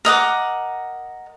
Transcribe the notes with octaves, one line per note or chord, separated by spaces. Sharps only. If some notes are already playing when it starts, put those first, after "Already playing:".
A#4 D#5 F#5 D6